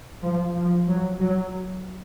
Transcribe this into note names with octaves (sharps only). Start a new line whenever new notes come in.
F3
F3
F#3
F#3